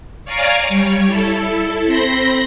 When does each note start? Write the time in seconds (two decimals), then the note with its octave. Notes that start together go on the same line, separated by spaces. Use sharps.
0.25 C#5 D5 F5 G#5 A#5 D6
0.68 G3 C#5
1.06 E4 A4
1.86 C4 B5 C6 A#6